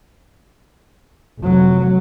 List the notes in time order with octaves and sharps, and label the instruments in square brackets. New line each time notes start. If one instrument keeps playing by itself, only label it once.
[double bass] F1 F#3